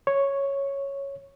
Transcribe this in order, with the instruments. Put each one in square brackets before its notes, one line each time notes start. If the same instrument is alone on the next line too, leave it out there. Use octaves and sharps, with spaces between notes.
[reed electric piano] C#5